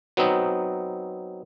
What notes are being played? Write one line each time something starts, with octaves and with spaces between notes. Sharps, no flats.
F#3 B3 C4 D#4